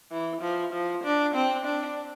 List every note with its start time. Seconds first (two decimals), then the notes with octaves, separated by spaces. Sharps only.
0.11 E3
0.42 F3
0.73 F3
1.04 D4
1.35 C4
1.66 D4